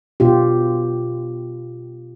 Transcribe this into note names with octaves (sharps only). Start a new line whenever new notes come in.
B2 F4 G4